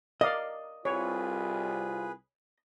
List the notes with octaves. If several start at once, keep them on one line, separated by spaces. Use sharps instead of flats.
A#4 D5 D#5 F5
C2 F4 G#4 B4 C#5